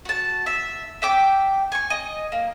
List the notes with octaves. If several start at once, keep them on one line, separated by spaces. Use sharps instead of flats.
F#4 A5
E5
E5 G5 D6
G#5 C#6
D#5
A#3